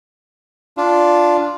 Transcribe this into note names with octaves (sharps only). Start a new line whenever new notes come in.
D4 F4